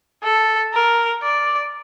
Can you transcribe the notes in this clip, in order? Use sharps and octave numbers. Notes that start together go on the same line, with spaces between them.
A4
A#4
D5